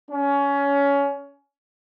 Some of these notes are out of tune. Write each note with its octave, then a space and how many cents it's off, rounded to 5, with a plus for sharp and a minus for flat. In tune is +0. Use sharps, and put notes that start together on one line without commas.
C#4 +20